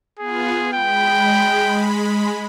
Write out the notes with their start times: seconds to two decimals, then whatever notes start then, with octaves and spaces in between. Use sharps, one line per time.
0.19 B3 F4 G#4
0.73 G#3 G5 B5